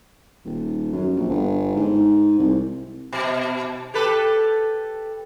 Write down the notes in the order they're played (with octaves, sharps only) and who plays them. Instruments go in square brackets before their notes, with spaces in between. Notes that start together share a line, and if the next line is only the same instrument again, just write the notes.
[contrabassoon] D#1
F#2
A#1
G1
G#2
C2
[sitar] B2
G4 A4 B4